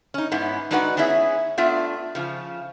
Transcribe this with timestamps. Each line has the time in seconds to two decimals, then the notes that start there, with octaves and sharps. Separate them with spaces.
0.14 C#4 D#4
0.32 G#2 B3 C#4 E4
0.71 G#3 D4 D#4 F#4 B4 F#5
0.97 B3 C#4 E4 G#4 E5
1.58 A3 B3 D4 F4 E5
2.15 C#3 F3